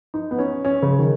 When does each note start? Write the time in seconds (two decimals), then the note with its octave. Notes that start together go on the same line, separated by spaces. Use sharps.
0.14 D#4
0.31 B3
0.39 C#4
0.65 C#4
0.82 C#3
0.99 D#3